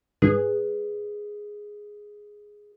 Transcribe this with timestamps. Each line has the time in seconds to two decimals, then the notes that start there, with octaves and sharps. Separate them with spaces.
0.22 G#2 G#4 B4